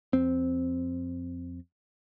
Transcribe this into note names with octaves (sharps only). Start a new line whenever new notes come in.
F2 C4